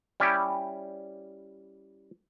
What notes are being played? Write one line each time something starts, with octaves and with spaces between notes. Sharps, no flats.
G3 C#4 E4 G4